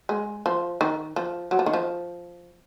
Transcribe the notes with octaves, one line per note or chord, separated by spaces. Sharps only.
G#3
F3
D#3
F3
F#3
F3
D#3
F3